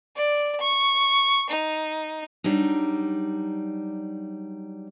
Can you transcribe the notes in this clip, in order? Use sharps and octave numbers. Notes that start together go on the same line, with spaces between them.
D5
C#6
D#4
F#3 G3 D4 D#4